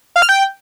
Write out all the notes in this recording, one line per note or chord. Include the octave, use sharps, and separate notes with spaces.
F5
F6
G5